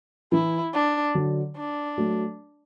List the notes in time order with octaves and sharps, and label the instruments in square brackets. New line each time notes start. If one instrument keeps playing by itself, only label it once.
[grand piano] E3 [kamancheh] E4
[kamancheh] D4
[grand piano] D3 F#3
[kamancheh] D4
[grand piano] F#3 A3